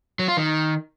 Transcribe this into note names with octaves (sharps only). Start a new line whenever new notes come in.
F#3
F4
D#3